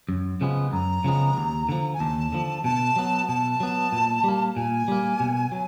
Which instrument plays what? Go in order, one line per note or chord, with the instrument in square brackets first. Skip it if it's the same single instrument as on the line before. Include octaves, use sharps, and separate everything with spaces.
[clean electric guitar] F#2
C#3 F3 G#3 B3
[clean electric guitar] F#2 [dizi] A#5
[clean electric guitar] C#3 F3 G#3 B3
D#2
D3 F3
[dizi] G#5
[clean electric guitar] D#2 [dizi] A5
[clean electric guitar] D3 F3
[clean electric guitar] B2 [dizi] A5
[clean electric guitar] F#3 B3
[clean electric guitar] B2 [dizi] A5
[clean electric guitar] F#3 B3
A#2
G3 A#3
[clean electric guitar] A#2 [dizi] G#5
[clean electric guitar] G3 A#3
B2
F#3